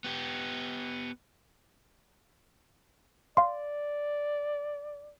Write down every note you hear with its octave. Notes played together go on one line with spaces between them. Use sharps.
B3 G4
D5 F5 C6